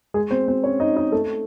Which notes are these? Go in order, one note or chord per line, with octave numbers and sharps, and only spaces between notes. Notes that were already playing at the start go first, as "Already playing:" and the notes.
G#3 G#4
C4 C5
C4 C5
C#4 C#5
D#4 D#5
D#4 D#5
A3 A4